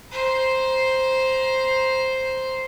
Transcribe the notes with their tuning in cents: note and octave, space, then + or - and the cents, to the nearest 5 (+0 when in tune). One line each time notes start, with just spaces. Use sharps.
C5 +0 A#5 +25